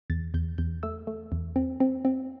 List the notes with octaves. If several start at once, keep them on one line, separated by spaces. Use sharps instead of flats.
E2 A6
E2 G6
E2 G6
A3 E6
A3
E2
C4
C4
C4